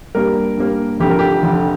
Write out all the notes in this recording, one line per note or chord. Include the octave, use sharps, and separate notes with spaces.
G2 G3 A#3 A#4
G2 G3 A#3
F1 F2 D3 G4
A#4
G4
F1 F2 D3